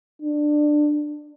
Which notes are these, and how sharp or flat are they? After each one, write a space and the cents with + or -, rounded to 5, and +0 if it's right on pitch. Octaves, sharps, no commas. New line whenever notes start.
D4 +15